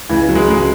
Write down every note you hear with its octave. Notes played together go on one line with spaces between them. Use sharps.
C#2 E3
F#3
G#3
C#2 G#3